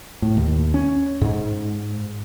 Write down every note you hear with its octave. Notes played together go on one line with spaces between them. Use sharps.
A2
D#2
C#4
G#2